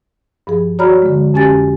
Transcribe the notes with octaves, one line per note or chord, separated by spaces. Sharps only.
G2 F3 G#4
F#4 C#5 D5 A#5 B5 F6
D3 G#3
F2 C#4 G4 G#5 A6